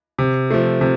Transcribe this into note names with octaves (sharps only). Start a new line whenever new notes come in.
C3
F3 A3
C3